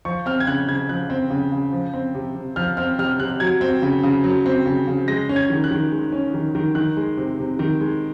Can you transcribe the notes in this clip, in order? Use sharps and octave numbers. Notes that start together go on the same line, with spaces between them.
F3 C#6
C4 F6
G#6
C#3 F#6
C#3 G#6
F3 F#6
C4
C#3
C#3
F3
C4
C3
C3
F3 F6
C4 F6
C3 F6
C3 F#6
F#3 G#6
C4
C#3
C#3
F#3
C4
C#3
C#3
G#3 A#6
C#4
G#6
D#3
F#6
D#3
G#3
C#4
D#3
D#3
D#3 F#6
G#3
C3
C3
D#3
G#3